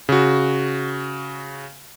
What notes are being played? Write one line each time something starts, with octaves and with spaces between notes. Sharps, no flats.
C#3 F#4